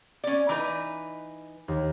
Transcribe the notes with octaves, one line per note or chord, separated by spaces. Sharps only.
C#4 D5
E3 D#4 B4 D6
D#2